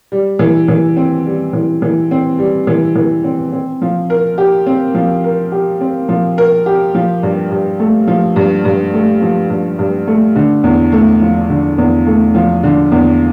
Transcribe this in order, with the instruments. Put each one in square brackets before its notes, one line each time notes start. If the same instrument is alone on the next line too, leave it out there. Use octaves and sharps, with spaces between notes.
[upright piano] G3
E3
E3
C4
G3
E3
E3
C4
G3
E3
E3
C4
C4
F3
A#4
G4
C4
F3
A#4
G4
C4
F3
A#4
G4
F3
G2
G2
A3
F3
G2
G2
A3
F3
G2
G2
A3
D3
E2
A3
F3
D3
E2
A3
F3
D3
E2